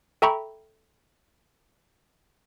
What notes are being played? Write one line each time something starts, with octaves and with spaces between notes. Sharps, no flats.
A4 E5 G5 A#5 B5 C#6